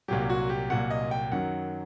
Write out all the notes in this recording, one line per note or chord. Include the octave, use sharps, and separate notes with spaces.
C2 A#2 F#3 G4
F#4
G4
C2 A#2 F#3 F#5
D#5
G5
F#2 D#3 F#3 F#5